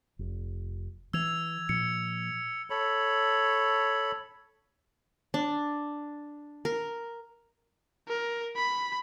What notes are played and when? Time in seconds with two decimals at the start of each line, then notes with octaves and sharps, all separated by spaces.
0.19 F1
1.13 E3 E6 G#6 F7
1.69 A#2 F3 C#7
2.70 A4 C#5 B5
5.34 D4
6.65 A#4
8.08 A#4
8.56 B5